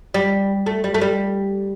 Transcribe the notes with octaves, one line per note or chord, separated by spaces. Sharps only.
G3
A3
G3
A3
G3